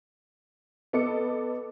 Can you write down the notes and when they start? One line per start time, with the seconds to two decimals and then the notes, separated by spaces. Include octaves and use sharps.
0.93 B3 A4 D#5 D6 C#7